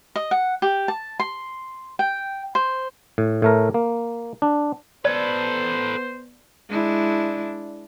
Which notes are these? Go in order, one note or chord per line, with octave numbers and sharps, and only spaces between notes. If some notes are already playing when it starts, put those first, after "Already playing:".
D#5
F#5
G4
A5
C6
G5
C5
A2
A2 A3 A#4
A#3
D4
B3 A4 B4 C5 D5
G#3 D4 E4